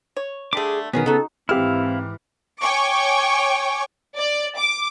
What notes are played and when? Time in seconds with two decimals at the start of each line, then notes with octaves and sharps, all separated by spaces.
0.17 C#5
0.53 D3 G3 A3 G#4 D6
0.93 B2 D#3 B3 C#4 G#4 A#4
1.06 C#3 D#4 F#4 A4
1.49 G#2 E3 C4 E4 G4 F5 F6
2.60 C#5 G5 G#5 C#6 D6
4.15 D5
4.57 D6